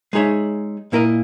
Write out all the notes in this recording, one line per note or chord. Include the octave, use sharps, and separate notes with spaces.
G#3 D#4 G#4 C#5 E5
A#2 A#3 E4 A#4 D#5